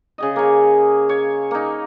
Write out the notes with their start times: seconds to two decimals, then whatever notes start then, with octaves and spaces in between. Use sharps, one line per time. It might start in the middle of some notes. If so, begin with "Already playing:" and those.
0.18 C#3 G#4 D#5
0.36 A#3 C#5
1.09 C#5
1.51 A#3 D#4